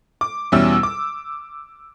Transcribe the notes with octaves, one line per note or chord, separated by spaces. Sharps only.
D6
E2 B2 G3 C#4 E4 E6
D6